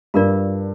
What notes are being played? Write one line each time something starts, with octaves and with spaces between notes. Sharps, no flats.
G2 F4 A#4 D5